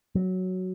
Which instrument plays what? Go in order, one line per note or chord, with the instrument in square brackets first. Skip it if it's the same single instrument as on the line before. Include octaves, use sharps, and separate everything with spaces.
[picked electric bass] F#3